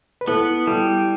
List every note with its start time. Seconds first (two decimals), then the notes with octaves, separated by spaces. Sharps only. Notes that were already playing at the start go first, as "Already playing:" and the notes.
0.21 B4
0.27 B3 E4 A4
0.67 G3 E4 A4